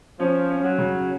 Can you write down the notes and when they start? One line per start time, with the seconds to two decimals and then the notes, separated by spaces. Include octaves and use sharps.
0.20 F3 C#4
0.49 C#4
0.63 F#3
0.78 C#3